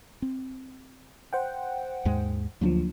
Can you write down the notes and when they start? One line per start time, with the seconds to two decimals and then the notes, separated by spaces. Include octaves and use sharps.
0.22 C4
1.33 C5 F#5 G5
2.05 D#2 G#2 G#3
2.61 D2 F3 F#3 A#3 D4